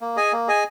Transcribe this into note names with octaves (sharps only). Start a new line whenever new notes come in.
A#3
G#4 D#5 G#5
A#3
G#4 D#5 G#5